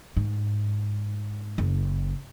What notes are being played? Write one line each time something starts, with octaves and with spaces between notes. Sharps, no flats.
G#2
F#1